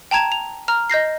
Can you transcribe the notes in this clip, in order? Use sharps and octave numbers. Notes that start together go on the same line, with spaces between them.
G5 A5 A#5 G#6 E7
F7
A#5 F6
D#5 G6 A#6 C7